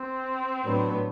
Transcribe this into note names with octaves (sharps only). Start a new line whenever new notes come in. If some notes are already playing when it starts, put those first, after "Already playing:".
Already playing: C4
A2 F#3 B3 D4